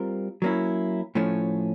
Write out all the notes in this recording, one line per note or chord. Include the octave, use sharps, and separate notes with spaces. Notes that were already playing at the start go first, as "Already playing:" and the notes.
Already playing: G3 C4 F4 A#4
F#3 A#3 C#4 E4
A2 F3 A3 C#4